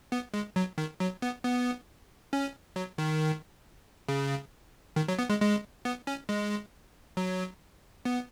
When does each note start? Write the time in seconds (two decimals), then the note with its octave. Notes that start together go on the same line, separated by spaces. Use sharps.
0.12 B3
0.34 G#3
0.56 F#3
0.78 D#3
1.00 F#3
1.22 B3
1.44 B3
2.33 C#4
2.76 F#3
2.98 D#3
4.08 C#3
4.96 D#3
5.08 F#3
5.19 B3
5.30 G#3
5.42 G#3
5.85 B3
6.07 C#4
6.29 G#3
7.17 F#3
8.05 B3